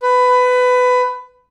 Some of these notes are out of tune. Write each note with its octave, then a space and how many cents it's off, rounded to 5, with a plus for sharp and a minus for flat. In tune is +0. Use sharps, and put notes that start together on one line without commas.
B4 +20